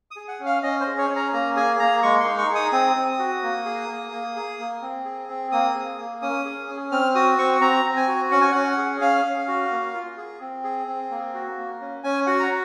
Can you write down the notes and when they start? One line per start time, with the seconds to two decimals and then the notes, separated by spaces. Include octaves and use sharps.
0.11 D#6
0.16 G#4
0.28 F#5
0.40 C#4
0.46 F5
0.63 C#4 D#5
0.81 C5
0.87 G#4
0.98 C#5
1.10 C#4
1.16 A#5
1.33 A#3 A#5
1.56 G#4 G#5
1.80 A#3 A#5
2.03 G#3 C#6
2.20 C6
2.26 D#4
2.38 C#6
2.49 G#4
2.55 D#6
2.72 C4 D#6
2.96 C4
3.19 F#4
3.43 A#3
3.66 G#4
3.89 A#3
4.12 A#3
4.36 G#4
4.59 A#3
4.82 C4
5.05 G#4
5.29 C4
5.52 A#3 D#6
5.75 G#4
5.98 A#3
6.22 C#4 D#6
6.45 G#4
6.69 C#4
6.92 C4 F6
7.15 F#4 D#6
7.38 C4 C#6
7.61 C4 A#5
7.85 C4
7.96 G#5
8.08 F#4
8.31 C#4 F#5
8.41 G#5
8.52 C#4 F#5
8.78 G#4
9.01 C#4 F5
9.24 C#4
9.48 F#4
9.71 A#3
9.94 F4
10.17 G#4
10.41 C4
10.64 G#4
10.87 C4
11.10 A#3
11.34 F#4
11.58 A#3
11.81 C#4
12.04 C#4 G#5
12.27 F#4 F#5
12.40 A#5